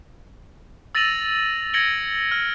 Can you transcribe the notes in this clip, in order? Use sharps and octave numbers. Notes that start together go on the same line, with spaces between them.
E6 A6 A#6 D#7 F7 F#7
G#6 A#6 C#7 D7 F#7 G7
F6